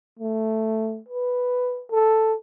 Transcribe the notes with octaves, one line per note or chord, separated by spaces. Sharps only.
A3
B4
A4